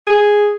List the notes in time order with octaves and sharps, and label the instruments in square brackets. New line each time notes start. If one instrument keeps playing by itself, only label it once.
[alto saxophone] G#4